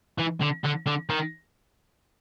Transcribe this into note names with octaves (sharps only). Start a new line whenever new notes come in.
E3
D3
D3
D3
D#3